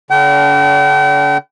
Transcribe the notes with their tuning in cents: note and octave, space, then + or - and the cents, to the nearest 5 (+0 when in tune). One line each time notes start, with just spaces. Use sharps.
D3 -45 D4 -40 G5 -40